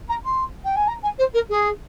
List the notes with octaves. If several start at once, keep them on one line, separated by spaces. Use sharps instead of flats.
A#5
C6
G5
G#5
A#5
G#5
C5
A#4
G#4